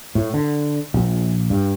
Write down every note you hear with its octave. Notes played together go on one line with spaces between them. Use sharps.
A2
D3
A#1
G2